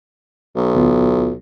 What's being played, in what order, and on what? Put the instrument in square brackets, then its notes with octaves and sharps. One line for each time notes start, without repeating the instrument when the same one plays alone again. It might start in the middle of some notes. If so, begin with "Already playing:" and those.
[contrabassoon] B1
[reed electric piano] D2 B3 F4